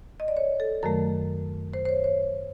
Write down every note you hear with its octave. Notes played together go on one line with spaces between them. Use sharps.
D#5
D5
C#5
A4
F#2 D#3 F#3 A3 A#4
C5
C5
C#5
C#5